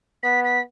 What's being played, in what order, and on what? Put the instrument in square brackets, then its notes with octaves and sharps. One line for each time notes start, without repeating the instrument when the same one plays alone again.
[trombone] B3 [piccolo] B6
[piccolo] B6